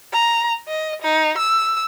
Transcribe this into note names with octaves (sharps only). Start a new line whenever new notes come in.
A#5
D#5
D#4
E6